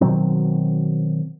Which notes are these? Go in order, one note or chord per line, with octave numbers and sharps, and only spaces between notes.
B2 D#3 F#3 C4